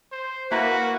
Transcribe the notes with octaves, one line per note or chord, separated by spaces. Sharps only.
C5
A#3 E4 F#4 B4